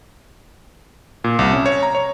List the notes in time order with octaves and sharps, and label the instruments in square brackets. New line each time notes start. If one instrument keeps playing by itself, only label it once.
[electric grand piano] A#2
C2
C#4
C#5
A#5
C#5